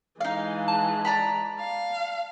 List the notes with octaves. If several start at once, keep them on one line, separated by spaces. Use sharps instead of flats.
E3 G#3 D#4 F5
A5
D5 A#5 B5
F5